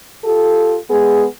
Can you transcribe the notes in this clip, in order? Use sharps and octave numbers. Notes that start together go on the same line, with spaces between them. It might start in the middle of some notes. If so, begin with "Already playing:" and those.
F4 G4 A4
G#3 B3 G#4